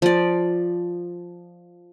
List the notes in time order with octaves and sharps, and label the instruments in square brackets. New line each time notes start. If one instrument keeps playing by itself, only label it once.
[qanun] F3 D5